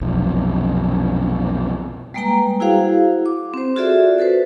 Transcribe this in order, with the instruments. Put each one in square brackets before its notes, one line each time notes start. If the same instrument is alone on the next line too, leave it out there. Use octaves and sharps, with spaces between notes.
[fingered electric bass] B1 F2 C3
[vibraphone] G3 G#3 A#3 B4 G5 A#5
E4 F#4 G#4 C5 F5 F#5
D6
C4 C5
F4 F#4 G#4 A4 D5 E5
F#4 A4 B4 C5